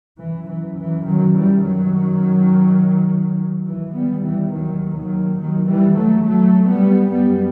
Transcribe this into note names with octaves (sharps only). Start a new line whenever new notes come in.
F#2 E3
E3
E3
D#3 F#3
E3 G3
D#3 F#3
D#2 E3
G3 B3
E3 G3
D#3 F#3
D#3 F#3
D#3 F#3
E3 G3
F#3 A3
F#3 A3
G3 B3
F#2 G3 B3